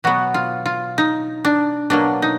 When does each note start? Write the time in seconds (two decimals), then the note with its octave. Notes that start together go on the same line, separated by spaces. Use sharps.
0.04 B2 F#3 B3 F#4
0.34 F4
0.66 F4
0.98 D#4
1.45 D4
1.90 B2 F#3 A#3 D4
2.22 D#4